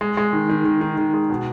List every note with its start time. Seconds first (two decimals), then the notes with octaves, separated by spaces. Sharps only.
0.01 G#3
0.17 G#3
0.33 D#3
0.49 D#3
0.65 D#3
0.81 D#3
0.98 D#3
1.14 G#3
1.30 B2